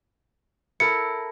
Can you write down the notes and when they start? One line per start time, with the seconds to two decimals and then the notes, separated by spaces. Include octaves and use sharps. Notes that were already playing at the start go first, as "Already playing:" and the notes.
0.80 E4 A4 A#4 C#7